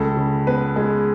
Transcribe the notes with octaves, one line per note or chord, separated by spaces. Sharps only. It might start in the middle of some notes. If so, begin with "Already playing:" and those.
Already playing: C#2 A4
C#3
B3 B4
G#3